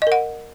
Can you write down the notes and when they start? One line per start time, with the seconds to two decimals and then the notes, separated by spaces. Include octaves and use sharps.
0.02 D#5
0.07 A#4
0.12 F#5